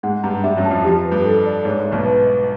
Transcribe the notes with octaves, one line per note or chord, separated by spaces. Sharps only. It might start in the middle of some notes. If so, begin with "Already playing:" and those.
G#2 G#3 F#5
G2 G3 A#5
G2 G3 E5
F#2 F#3
A5
F2 F3
F2 F3 G4
B4
G2
A4
D5
G#2 C#5
G#2
E5
B1 B2
B4
D#5